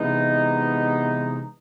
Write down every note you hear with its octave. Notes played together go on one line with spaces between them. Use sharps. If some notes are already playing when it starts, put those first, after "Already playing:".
Already playing: C3 E3 G#3 B3 D#4